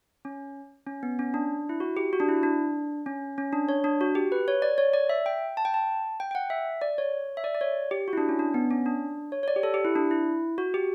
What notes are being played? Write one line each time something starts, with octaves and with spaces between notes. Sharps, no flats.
C#4
C#4
B3
C#4
D4
E4
F#4
G4
F#4
D4
E4
D4
C#4
C#4
D4
C#5
D4
F#4
G4
B4
C#5
D5
C#5
D5
E5
G5
A5
G5
A5
G5
G5
F#5
E5
D5
C#5
E5
D5
D5
C#5
G4
F#4
E4
D4
C#4
D4
B3
C#4
D4
C#5
C#5
D5
G4
A4
G4
E4
D4
E4
F#4
G4